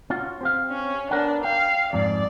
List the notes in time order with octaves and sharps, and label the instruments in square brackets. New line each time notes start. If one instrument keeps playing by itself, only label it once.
[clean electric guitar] C#4 F4 F#4
C4 G4 F5
[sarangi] C#4
[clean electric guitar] B3 A#4 F#5 [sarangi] D4
[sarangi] F5 [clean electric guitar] G5
[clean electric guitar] F2 G#2 [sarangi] D5